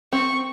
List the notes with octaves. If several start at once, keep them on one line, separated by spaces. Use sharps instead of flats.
C4 C#6